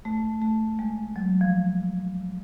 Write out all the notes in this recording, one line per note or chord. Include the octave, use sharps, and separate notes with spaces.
A3
A3
G#3
F#3
F3